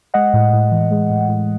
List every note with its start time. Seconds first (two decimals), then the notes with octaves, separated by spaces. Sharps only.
0.14 G#3 D#5 F#5
0.33 A2
0.53 A2
0.72 E3
0.91 G#3
1.10 A2
1.29 A2